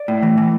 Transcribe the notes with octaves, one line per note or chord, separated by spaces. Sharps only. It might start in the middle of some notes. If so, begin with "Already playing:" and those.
Already playing: D5
A2
E3
E3